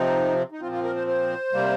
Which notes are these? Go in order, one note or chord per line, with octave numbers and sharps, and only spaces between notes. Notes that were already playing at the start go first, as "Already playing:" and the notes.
Already playing: C3 F3 C4 D#4
D#4
A#2 F3 C4 F4
F4
A#4
C5
C5
C3 G3 A#3